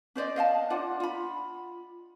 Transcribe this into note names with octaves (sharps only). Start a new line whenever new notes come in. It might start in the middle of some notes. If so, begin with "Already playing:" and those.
C#4 C5 D5 D#5
D#5 F5 F#5 A5
D4 F4 D5 F#5
F4 B5